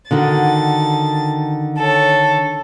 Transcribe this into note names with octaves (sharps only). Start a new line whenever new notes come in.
D3 D#3 F#4 A6
A4 C#5